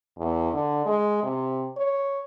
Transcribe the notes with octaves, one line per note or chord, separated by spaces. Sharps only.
E2
D3
G#3
C3
C#5